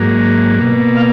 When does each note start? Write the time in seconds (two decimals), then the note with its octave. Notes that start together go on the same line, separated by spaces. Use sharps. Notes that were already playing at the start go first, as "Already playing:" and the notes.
Already playing: G#2 F#3 A#3
0.59 B2 A#3
0.97 F5